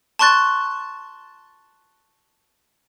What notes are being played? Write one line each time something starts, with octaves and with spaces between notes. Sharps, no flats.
A5 C6 C#6 F#6 A6